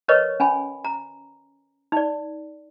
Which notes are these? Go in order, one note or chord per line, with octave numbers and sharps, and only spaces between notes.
A#4 B4 C#5 D#5 C#6
C#4 G#5 B5
A#5
D#4 D5